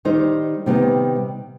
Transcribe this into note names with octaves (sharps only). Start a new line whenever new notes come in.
D#3 G3 D#4 C5
C3 D#3 G3 B3 D#4